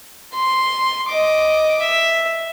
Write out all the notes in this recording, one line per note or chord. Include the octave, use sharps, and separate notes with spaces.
C6
D#5 D6
E5